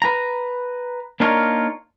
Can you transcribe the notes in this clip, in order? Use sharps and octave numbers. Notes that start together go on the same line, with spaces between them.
B4 A#5
A#3 D4 D#4 F4 A#4 C#5